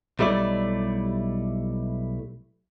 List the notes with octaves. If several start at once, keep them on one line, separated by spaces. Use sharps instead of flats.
B1 G3 A3 E4 D5